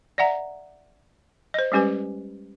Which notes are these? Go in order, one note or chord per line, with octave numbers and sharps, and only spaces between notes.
D5 E5 F#5 A#5
C5 D#5
G3 G#3 C#4 G4 B4 G#5